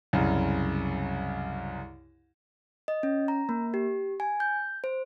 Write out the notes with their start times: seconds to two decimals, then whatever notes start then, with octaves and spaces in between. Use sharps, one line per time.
0.13 C2 F#2 C#3
2.88 D#5
3.03 C#4
3.28 A#5
3.49 A#3
3.74 G4
4.20 G#5
4.40 G6
4.84 C5